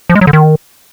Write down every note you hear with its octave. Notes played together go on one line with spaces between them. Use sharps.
F3
G#3
F#3
D3
D#3